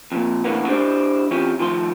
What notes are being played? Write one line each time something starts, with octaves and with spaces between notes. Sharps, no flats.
F2 A#2
E2 A2 D3 A#3 B3
D4 E4 G4 B4 C5 D5
E3 C4 C#4 F4 G4
D#3 F3 A3 C6